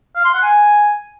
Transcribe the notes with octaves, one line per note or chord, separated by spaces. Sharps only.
F5
C6
F#5
G#5